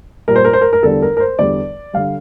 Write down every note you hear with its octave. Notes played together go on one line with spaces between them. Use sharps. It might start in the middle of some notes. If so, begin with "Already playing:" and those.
A#2 G3 A#4
C5
A#4
C5
A#4
A#4
E2 D3 G3 A4
A#4
A#4
C5
E2 D3 G3 D5
D3 G3 F5